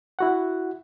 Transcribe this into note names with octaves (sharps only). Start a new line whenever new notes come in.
E4 F#4 F#5